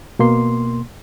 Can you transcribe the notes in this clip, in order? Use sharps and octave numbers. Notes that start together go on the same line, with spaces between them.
B2 A#3 C6